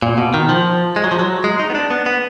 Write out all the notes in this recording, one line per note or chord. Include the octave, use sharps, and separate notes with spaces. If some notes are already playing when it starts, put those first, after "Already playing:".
A#2
B2
D#3
F3
G#3
F#3
F3
F#3
G#3
D#4
B3
D4
B3
B3